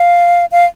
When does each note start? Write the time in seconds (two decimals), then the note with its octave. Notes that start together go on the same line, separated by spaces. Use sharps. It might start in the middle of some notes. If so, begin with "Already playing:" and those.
Already playing: F5
0.52 F5